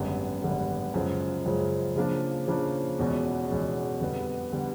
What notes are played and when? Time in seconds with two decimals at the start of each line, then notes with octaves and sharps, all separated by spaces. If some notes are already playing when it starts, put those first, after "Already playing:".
Already playing: G#1 F#2 D3 G3 B3
0.42 G#1 F#2 D3 G3 B3
0.94 F#2 C#3 F3 G#3
1.46 F#2 C#3 F3 G#3
1.96 C#3 F3 A#3 D4
2.48 C#3 F3 A#3 D4
2.99 E2 B2 G#3 C#4 F#4
3.49 E2 B2 G#3 C#4 F#4
4.01 F2 D3 G3 B3
4.53 D3 G3 B3